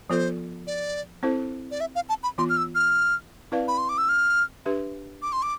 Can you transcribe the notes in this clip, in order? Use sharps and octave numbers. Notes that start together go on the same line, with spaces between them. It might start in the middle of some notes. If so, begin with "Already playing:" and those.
F3 B3 F4 A4 C5
D5
C4 E4 A4 C5
D5
E5
F5
A5
B5
E3 B3 F4 C6
F6
E6
F6
C4 E4 B4 D5 F5
B5
C6
D6
E6
F6
D4 G4 B4 E5
D6
C6
D6